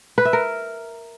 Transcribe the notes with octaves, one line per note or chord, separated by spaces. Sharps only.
B4
E5
A#4